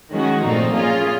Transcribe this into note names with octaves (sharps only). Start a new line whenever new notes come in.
D#3 G#3 C#4 F#4
A#2 F3 A3 C4 D#4
A#3 C#4 F4 G#4